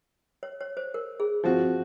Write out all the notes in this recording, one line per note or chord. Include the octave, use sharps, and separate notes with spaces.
C#5
C#5
C5
A#4
G#4
F3 C4 F#4